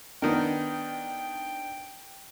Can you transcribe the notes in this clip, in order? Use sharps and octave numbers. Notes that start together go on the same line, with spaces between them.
D#3 B3 D4 A#4 G5